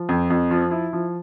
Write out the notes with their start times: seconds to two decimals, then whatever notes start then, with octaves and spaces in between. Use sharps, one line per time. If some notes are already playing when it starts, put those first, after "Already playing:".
Already playing: F3
0.09 F2
0.30 F2
0.51 F3
0.71 E4
0.93 F3